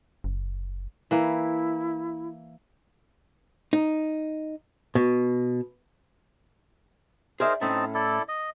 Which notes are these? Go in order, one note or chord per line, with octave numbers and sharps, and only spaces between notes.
F#1
E3 A#3 E4
D#4
B2
D#4 G#4 A#4 C5 D5 E5
A2 A3 C4 C#4 D#4 A5
E4 A4 D5
D#5